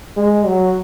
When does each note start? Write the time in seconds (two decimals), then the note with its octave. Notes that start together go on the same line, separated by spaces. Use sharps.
0.17 G#3
0.46 F#3